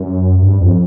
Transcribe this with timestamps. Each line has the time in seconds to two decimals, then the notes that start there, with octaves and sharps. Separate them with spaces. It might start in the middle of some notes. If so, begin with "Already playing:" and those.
Already playing: F#2
0.42 G2
0.61 F2